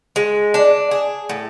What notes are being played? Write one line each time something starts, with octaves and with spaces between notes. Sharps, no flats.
G#3
D4
G#4
A2